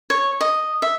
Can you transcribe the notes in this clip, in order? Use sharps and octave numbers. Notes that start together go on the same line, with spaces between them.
C#5
D#5
E5